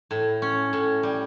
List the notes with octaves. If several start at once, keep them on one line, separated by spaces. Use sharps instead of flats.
A2
C#4
A2
G3